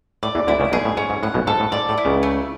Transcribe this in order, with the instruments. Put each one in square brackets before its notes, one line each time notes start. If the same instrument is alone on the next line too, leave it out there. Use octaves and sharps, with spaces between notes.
[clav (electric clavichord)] A2 [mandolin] D5
[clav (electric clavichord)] E2 E3
[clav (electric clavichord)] D2 D3 [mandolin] E4
[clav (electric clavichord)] C#2 C#3
[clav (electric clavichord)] B1 B2 [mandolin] G#4
[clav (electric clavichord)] A2
[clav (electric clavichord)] G#2 [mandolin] C#4
[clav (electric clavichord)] G#2
[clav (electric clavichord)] A2 [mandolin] F#5
[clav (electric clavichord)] B1 B2
[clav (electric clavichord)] G#2 [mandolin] A4
[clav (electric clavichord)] A2
[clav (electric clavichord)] G#2 [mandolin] D5
[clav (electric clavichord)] A2
[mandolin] E4
[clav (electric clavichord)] C#2 C#3
[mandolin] A3